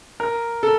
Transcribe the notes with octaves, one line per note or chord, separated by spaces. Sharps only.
A#4
A4